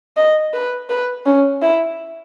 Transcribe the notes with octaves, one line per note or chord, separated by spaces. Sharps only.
D#5
B4
B4
C#4
E4